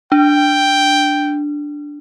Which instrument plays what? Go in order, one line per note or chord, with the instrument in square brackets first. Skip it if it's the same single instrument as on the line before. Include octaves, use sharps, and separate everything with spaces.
[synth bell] D4 [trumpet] G5